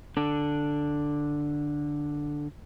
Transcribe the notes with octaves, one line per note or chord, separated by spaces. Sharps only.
D3 D4